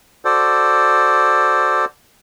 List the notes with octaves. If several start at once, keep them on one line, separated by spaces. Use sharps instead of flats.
F#4 A4 C5 D5